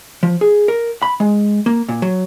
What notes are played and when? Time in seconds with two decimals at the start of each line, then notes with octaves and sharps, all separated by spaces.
0.23 F3
0.41 G#4
0.68 A#4
1.02 B5
1.20 G#3
1.66 A#3
1.89 A#2
2.02 F#3